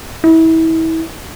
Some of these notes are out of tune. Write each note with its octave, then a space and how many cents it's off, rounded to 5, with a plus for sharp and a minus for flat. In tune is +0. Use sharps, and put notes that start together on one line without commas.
E4 -30